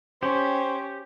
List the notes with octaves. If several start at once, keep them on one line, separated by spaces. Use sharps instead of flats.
C#4 G4 C5